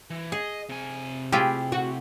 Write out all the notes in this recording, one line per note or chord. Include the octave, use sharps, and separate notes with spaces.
E3
G#4 D#5
C3 G#5
E4 F4 G4 G#4
F#4